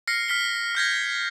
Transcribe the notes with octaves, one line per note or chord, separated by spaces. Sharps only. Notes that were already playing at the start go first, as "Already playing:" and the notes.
F6 A#6 C7 C#7
F6 B6 G7
F6 G6 G#6 A#6